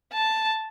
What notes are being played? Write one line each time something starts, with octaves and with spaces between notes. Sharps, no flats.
A5